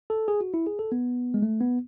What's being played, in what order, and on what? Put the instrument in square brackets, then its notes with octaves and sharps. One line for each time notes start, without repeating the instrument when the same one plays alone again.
[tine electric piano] A4
G#4
F#4
E4
G#4
A4
B3
G#3
A3
B3